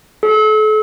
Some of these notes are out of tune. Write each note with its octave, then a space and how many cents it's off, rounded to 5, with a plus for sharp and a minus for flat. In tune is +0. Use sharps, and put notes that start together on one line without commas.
A4 -35